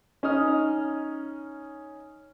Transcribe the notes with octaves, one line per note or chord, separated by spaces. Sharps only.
C#4 D#4 D#6 F6